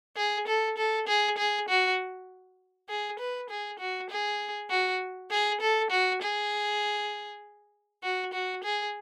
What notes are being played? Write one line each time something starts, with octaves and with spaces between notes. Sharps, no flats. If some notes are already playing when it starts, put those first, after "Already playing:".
G#4
A4
A4
G#4
G#4
F#4
G#4
B4
G#4
F#4
G#4
F#4
G#4
A4
F#4
G#4
F#4
F#4
G#4